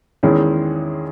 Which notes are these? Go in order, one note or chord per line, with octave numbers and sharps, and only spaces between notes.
E2 D#3 G#3 C#4 E4